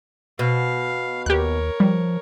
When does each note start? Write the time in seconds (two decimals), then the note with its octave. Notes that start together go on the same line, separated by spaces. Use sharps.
0.39 B2 F5
1.26 D#2 G4 A#4 C#5 F#6
1.80 F3 G3